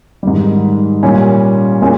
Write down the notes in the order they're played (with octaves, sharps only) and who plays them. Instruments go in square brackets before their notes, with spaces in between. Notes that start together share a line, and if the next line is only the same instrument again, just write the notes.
[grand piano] G#2 D#3 G3
A#2 G3 C#4
A#2 G#3 C#4